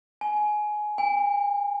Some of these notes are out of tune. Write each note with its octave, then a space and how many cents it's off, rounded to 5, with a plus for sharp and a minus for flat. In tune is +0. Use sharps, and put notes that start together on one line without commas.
G#5 +20
G#5 -45